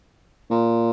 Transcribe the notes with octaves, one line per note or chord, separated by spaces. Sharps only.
A#2